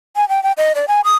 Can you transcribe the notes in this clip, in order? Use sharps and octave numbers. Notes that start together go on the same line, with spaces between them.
G#5
G5
G5
D#5
D5
G#5
D#6